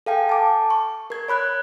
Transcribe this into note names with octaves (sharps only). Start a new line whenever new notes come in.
A4 F5 G5 G#5
A5 D6
C#6
A#4 G#6
C#5 B5 F#6 G#6